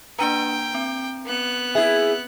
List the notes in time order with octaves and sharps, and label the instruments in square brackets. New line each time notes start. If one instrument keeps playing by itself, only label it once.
[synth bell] A#3 D4 B4 [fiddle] G5 [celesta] A#5 D#7
[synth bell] C4
[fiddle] B3 F#6
[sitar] E4 G#4 [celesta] E5